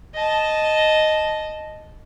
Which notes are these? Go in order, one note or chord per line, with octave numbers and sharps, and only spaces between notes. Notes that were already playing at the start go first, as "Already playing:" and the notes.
D#5 A5